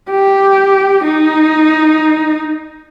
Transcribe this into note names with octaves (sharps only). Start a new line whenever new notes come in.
G4
D#4